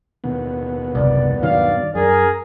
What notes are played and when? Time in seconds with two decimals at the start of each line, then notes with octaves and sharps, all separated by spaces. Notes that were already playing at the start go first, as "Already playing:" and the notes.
0.24 D#2 B2 B3
0.95 F#1 C2 D5
1.42 G2 D#3 F#3 D5 F5
1.95 F#2 G#4 A#4